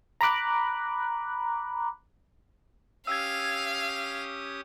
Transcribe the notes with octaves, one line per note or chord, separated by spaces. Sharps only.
A#5 B5 D6 F#6
C#4 G4 F5 D#6 E6 G#6